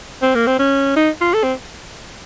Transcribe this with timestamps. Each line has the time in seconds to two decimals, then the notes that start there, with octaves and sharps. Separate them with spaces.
0.22 C4
0.35 A#3
0.47 C4
0.59 C#4
0.96 D#4
1.21 F4
1.34 A4
1.44 C4